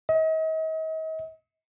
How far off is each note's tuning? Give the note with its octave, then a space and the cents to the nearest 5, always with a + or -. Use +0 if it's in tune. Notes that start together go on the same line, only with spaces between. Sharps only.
D#5 +40